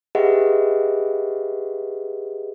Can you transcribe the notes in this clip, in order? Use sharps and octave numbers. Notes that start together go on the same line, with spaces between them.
G4 G#4 B4 D#5 E5 F#5